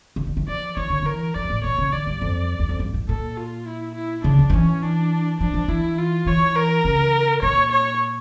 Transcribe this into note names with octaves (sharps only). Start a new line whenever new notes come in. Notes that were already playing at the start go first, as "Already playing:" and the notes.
C#3
D3
E3
F3 D5
E3 C#5
D3
E3 A#4
F3 D5
G2
A2
A#2 C#5
C#3
D3 D5
G2
F2
E2
F2
G2
A2
A#2 A4
F4
E4
E4
C#3 D4
E3
F3
E3 C#4
D4
F3 D4
F3
E3 E4
F4
E3 C#5
A#4
C#3
A#2 C#5
C#5